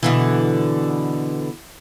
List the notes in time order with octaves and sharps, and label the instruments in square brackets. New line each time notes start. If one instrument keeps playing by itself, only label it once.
[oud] B2 D3 E3